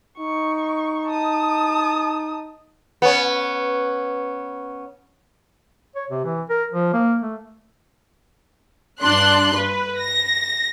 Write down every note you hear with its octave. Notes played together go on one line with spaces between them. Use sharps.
D#4 C#6
A5 D#6
B3 C#4
C#5
C3
E3
A#4
F3
A#3
A3
G2 D4 C6 F#6
B4
A#6